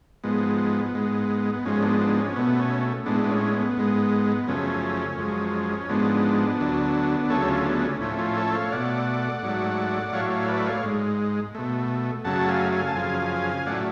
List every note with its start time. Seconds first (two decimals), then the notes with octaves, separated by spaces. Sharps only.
0.24 G#2 F3 G#3 B3
0.94 G#2 G#3
1.53 B3
1.65 G#2 F3 G#3 C#4
1.82 B3 D4
2.00 B3 D4
2.19 C#4
2.36 B2 A3 B3
2.59 C#4
3.06 A2 G#3 B3 D4
3.24 B3
3.29 C#4
3.54 B3
3.77 G#2 G#3
4.47 F#2 C#3 F3 A3 C#4
5.18 F#2 F3 G#3
5.89 G#2 F3 G#3 B3 D4
6.60 D2 D3 F#3
7.30 D2 C#3 F#3 A3 A4 C#5
7.48 C#4 F4
7.66 B3 D4
7.83 C#4
8.01 A2 F3 A3 C#4
8.18 C#4 F4
8.37 A4 C#5
8.55 C#5 F5
8.71 B2 A3 D5 F#5
9.42 G#2 F#3 A3
10.13 A2 F#3 A3 C#5 F5
10.30 C#5 F5
10.48 B4 D5
10.66 C#5 F5
10.83 G#2 G#3
11.55 B2 A3
12.25 F#2 C#3 F#3 A3 F#5 A5
12.48 F5 G#5
12.72 F5 G#5
12.87 A5
12.95 F#2 C#3 F3 F5 G#5
13.66 A2 F#3 A3 D5 F#5